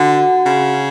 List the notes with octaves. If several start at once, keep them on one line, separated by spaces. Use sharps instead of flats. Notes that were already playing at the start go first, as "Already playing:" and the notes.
Already playing: D3 F#4 F#5
C#3